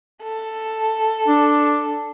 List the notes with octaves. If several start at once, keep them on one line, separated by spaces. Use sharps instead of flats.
A4
D4